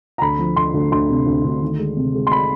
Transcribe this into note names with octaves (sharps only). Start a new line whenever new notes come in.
A#5
D2 B5
F3
D2 C6
D2
D2 C6
C3
D2
D2
D#3
G#3
C3
G#3
C6
B5